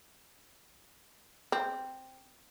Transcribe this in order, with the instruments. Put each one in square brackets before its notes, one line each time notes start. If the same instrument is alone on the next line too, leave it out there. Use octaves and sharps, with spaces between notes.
[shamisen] C4